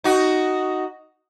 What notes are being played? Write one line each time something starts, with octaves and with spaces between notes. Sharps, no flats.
D#4 F#4